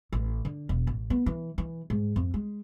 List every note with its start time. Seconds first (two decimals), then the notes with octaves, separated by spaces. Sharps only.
0.13 A1
0.45 D3
0.69 E1
0.87 A1
1.10 B3
1.26 E3
1.58 E3
1.90 G#2
2.16 F2
2.34 G#3